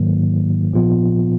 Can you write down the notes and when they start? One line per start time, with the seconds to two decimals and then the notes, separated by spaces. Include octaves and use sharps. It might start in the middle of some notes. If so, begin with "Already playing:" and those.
Already playing: G#2 D#3 F#3 A#3
0.73 A#2 F3 B3 F4